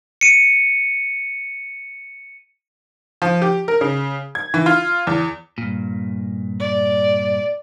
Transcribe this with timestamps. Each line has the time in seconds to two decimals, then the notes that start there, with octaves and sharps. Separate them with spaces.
0.21 C#7 D#7
3.22 F3
3.42 G4
3.68 A#4
3.81 C#3
4.35 G#6
4.54 E3
4.66 F4
5.07 E2
5.58 G2 A#2
6.60 D5